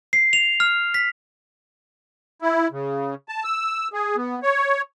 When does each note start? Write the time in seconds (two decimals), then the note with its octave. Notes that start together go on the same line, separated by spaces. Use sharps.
0.13 C7
0.33 F7
0.60 F6
0.94 B6
2.42 E4
2.71 C#3
3.28 A5
3.44 E6
3.93 G#4
4.16 B3
4.43 C#5